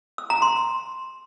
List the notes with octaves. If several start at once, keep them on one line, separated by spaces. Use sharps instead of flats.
E6
A#5
C6